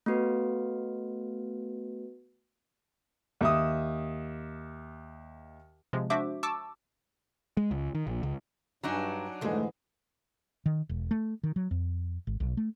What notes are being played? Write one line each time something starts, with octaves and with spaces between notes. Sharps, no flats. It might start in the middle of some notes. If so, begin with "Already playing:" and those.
A3 B3 F#4 B4
D#2 E5 D#6
C3 F3 G#3
D4 F#4 C5 E5 D6
A5 C#6 D6 E6
G#3
C#2
D#3
A#1
C#2
G2 F#3 D4 D#4 G#5 A#5
F2 G#2 D3 E3 G#3 A3
D#3
E1
A3
D#3
F#3
F2
G#1
B1
A3